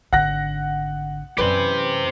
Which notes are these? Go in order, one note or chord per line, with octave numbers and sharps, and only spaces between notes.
G#1 D3 F#5 F#6 A#6
F#2 E3 G#3 C#4 G4 B4 C5